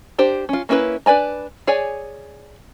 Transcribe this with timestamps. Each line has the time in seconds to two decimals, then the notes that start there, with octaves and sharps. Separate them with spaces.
0.18 D4 G4 C5
0.49 C#4 F4
0.69 A#3 C#4 E4 G#4 B4
1.06 D4 B4 D5 G#5 A#5
1.67 G#4 C#5 D5 G#5